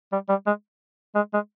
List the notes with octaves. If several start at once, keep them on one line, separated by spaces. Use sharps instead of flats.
G3
G3
G#3
G#3
G#3